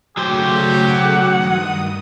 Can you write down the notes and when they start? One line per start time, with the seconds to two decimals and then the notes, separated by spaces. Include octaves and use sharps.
0.17 C#3 F#3 A3 F#4 G4 C5
0.90 F#5
1.32 G2 D#3 D#6